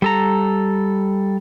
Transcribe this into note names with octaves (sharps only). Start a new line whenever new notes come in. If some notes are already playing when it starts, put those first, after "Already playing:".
G3 A4 A#5